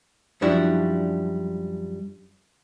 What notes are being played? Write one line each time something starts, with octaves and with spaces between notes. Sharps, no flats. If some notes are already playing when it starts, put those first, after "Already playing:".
F#2 F3 G3 D4 E4 F#4